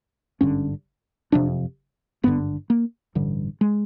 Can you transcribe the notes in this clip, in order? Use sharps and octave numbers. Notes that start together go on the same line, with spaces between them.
G#1 G2 D3 C#4
F#1 F2 C3 D4
G#1 G2 D3 B3
A#3
A1 G2 D3
G#3